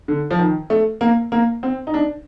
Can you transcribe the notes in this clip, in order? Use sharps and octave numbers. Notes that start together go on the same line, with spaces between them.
D3
F3
D#3
A3
A#3
A#3
C4
D#4
D4